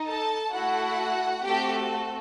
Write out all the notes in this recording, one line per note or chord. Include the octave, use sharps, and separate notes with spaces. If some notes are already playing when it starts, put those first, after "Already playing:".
Already playing: D#4
A4 A5
A3 E4 F#4 A4 F#5
A3 C4 F#4 G4 A4 G5